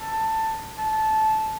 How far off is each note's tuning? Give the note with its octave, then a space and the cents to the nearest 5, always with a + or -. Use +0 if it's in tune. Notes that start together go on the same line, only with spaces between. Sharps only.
A5 +15
A5 -15